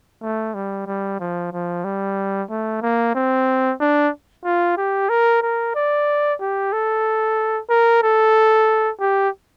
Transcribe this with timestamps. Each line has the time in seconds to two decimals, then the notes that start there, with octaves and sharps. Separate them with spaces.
0.22 A3
0.54 G3
0.87 G3
1.19 F3
1.53 F3
1.84 G3
2.50 A3
2.82 A#3
3.15 C4
3.80 D4
4.45 F4
4.77 G4
5.09 A#4
5.42 A#4
5.75 D5
6.40 G4
6.73 A4
7.70 A#4
8.03 A4
9.00 G4